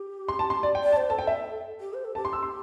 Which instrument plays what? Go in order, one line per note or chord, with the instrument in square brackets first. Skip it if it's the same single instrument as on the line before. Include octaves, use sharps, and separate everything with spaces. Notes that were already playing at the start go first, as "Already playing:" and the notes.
Already playing: [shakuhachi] G4
[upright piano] C6
A5
C6
D5
G5
[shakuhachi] D5
[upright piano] A5
[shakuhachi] C5
[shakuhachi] A4 [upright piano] A5
[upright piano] G5
E5
[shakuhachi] G4
C5
A4
[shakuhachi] G4 [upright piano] A5
[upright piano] C6
E6
C6